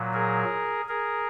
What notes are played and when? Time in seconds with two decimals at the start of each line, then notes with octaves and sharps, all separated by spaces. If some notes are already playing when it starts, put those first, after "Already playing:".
Already playing: A#2 F#3
0.14 G#4 A#4
0.89 G#4 A#4